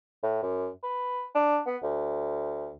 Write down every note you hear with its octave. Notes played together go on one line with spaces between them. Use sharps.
A2
F#2
B4
D4
B3
D2